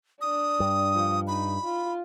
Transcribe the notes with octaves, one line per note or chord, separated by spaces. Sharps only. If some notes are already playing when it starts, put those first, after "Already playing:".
D4 D#6
G2
F3
D#4 B5
F4